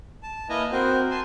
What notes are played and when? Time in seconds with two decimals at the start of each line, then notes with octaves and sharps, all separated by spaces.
0.23 A5
0.49 A#3 E4 B4 D#5 G#5 A#5
0.72 C4 F#4 A#4 C5
1.11 G#5 A5 C6